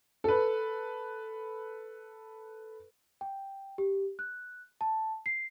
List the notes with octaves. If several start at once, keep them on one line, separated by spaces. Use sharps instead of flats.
A4 B4
G5
G4
F#6
A5
C7